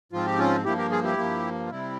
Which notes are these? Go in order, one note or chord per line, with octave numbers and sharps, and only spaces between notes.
G#2 F3 C4 F4
G4
C#4 F4
G2 F3 A#3 E4 G4
G4 A#4
F4 G#4
E4 G4
G2 F3 A#3
F4
C3 G3 C4 E4